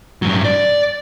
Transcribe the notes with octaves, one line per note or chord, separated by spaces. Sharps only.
G2 F#3
D5